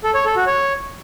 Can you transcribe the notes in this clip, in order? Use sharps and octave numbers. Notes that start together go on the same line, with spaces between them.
A4
C#5
A4
F#4
C#5